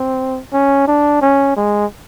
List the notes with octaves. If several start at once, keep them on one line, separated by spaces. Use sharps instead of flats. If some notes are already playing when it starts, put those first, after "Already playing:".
Already playing: C4
C#4
D4
C#4
G#3